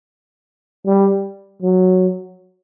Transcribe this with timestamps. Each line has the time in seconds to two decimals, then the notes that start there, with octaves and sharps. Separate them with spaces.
0.86 G3
1.62 F#3